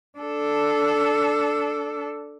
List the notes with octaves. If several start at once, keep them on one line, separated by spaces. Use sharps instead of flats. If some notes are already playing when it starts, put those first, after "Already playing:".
D4 A4